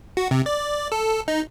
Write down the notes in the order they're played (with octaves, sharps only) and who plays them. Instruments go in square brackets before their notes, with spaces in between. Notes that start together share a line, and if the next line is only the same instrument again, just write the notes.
[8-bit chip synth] F#4
C3
D5
A4
D#4